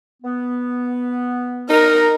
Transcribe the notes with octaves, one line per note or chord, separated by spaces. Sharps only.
B3
D#4 A#4